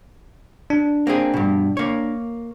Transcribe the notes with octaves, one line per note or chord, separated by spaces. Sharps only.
D4
A#3 C4 G#4
G2 B2
A#3 C#5